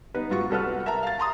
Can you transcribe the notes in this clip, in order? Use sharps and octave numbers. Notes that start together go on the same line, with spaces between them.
B3 D#4 B4
G#2 F4 F#4 C#6
C2 F#4 A4 B4 F#5 F6
A#4 E5 A5 A#5
F5 A6
A5 A#5 C6 D#6